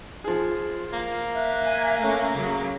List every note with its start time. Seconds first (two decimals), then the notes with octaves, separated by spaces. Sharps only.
0.24 F3 F4 G#4
0.93 A#3
1.33 E5 F#6
1.64 G#5
2.00 A3 C#4
2.34 C#3 F#3